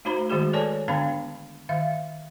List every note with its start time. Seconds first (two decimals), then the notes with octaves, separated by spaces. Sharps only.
0.05 A3 D#4 F#4 C5 A#5 B5
0.30 D#3 G#3 F#4 G#4 C5
0.53 A4 B4 C#5 D5 G#5 A5
0.88 D3 B3 D4 F5 A5 B5
1.69 D#3 E5 F5